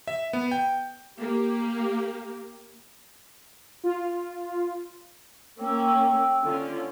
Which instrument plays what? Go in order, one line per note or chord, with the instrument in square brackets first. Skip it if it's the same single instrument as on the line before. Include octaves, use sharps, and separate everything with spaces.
[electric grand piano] E5
B3
G5
[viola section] A#3 G4
[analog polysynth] F4
[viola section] A#3 C#4 [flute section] G5 E6
[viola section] D3 C#4 F4